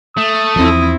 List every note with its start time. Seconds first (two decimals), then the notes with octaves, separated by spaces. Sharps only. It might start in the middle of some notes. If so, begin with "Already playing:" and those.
0.17 A3 D#6
0.56 E2 F3 C4 E4